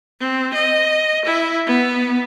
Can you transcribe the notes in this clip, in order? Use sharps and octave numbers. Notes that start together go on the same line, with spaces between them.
C4
D#5
E4
B3